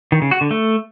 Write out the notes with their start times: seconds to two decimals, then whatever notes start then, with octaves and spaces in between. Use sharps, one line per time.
0.12 D#3
0.22 C#3
0.31 F#4
0.41 D3
0.51 A3